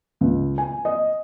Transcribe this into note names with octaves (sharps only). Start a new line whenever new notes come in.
C#2
G#5
D#5